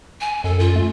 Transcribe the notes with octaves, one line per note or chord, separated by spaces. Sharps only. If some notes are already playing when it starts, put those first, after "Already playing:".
G#5
F#2 A4
F4
A3